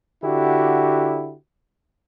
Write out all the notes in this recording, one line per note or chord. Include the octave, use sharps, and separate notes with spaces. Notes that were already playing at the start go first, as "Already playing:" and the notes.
D3 E4 F#4 G4